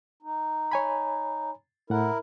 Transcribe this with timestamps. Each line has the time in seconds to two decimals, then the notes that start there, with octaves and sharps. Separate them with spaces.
0.22 D#4
0.72 C#5 G#5 B5
1.90 A2 E4 A#4 F#5